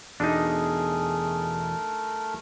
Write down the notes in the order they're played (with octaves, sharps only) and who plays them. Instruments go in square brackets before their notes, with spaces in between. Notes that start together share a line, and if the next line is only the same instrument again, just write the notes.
[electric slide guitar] E2 B2 [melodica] A3 A#4 [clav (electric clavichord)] D4 D#4 [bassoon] G#4